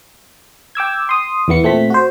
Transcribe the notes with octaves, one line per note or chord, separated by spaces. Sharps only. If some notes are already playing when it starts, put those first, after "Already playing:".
G5 D6 E6 G#6
C6 D#6
E2 E3 B3 C#7
A#2 A3 C4 B6
F#4 C5